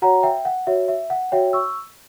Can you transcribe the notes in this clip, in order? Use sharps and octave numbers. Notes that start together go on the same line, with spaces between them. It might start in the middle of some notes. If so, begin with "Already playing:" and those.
F#4 C#5 F#5 A#5
E5 G5
F#5
F#4 C#5 E5
E5
F#5
F#4 C#5 E5 G5
C#6 E6